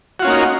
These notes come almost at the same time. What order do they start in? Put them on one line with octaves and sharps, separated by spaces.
F#4 F4 C#4 A#3 D#4